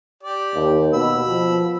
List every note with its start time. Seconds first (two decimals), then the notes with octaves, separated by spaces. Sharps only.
0.23 G4 D5
0.55 D#2
0.94 B2 B5 E6
1.28 F3